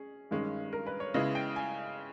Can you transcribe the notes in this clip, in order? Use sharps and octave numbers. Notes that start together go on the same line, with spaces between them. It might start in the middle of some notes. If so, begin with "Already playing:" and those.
Already playing: C#4 G#4
G2 D#3 G#3 C#4
A#4
B4
C#5
C#3 G#3 B3 E4 D#5
G5
G#5